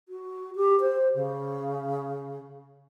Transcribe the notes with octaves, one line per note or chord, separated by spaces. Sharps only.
F#4
G4
C5
C#3